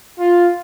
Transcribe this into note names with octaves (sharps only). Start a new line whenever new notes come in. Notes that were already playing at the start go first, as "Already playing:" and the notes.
F4